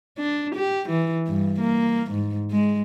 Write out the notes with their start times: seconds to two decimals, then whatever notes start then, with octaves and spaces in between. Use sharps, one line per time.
0.19 D4
0.55 G4
0.89 E3
1.27 G2
1.60 A#3
2.11 G#2
2.51 G#3